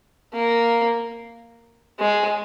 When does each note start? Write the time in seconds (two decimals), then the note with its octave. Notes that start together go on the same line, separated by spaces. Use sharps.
0.33 A#3
2.00 G#3